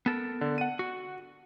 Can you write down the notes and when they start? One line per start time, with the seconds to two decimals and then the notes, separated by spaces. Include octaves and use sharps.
0.06 B3 A4 A#4
0.41 D3
0.58 F#5 D#7
0.79 F#4